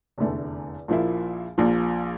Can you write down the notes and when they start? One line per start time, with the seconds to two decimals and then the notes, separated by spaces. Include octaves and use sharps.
0.18 F1 E2 D3 A3
0.88 A#1 A#2 F3 A#3 E4
1.58 A#1 A#2 F3